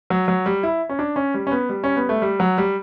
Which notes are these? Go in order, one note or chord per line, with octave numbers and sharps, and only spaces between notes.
F#3
F#3
G3
E4
C#4
D4
C#4
G3
C#4
B3
G3
C#4
B3
A3
G3
F#3
G3